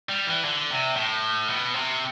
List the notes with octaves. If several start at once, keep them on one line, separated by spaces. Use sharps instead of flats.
G3
E3
D3
C3
A2
B2
C3